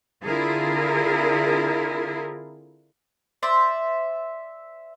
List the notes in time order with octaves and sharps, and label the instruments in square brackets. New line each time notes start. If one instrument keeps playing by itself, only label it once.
[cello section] D3 C4 E4 F4 G#4 A#4
[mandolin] C5 D5 E5